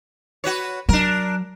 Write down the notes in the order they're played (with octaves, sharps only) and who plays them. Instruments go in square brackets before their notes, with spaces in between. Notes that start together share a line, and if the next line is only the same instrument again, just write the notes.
[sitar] F#4 B4 C#5
[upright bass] F#3 [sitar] D4 A#4